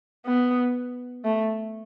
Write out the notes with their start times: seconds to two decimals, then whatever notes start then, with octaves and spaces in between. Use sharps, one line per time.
0.25 B3
1.24 A3